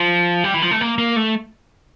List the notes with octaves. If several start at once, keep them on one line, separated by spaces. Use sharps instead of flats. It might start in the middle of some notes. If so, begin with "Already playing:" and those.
Already playing: F3
G3
E3
F3
A3
A#3
A#3
A3